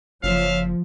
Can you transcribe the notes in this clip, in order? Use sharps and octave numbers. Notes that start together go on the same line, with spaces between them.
F#1 F3 C#5 E5 F5